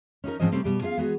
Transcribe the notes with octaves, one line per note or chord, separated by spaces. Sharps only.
C#4 D#4 F#4 A#4
G#2 F3 C4 C#4 C5 D#5
C3 G3 A3 C4 C#4 D#4
B2 G3 G4
C#4 F4 G#4 E5 F5
G#3 B3 F#4 G#4